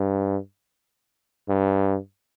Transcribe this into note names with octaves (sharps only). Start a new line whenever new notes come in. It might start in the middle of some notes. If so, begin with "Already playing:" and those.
Already playing: G2
G2